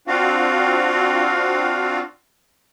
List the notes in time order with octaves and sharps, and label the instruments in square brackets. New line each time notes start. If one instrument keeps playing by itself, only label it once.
[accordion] C4 D4 F4 F#4 F5